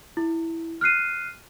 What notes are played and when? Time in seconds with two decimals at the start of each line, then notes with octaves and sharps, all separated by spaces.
0.17 E4
0.81 F6 F#6 C7 D#7